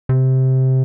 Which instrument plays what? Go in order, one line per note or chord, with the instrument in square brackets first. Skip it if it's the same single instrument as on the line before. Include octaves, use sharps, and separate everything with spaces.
[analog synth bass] C3